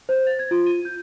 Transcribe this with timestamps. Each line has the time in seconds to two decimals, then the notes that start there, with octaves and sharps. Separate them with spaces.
0.09 C5
0.27 A6
0.39 G#6
0.51 F4
0.66 D#7
0.85 G6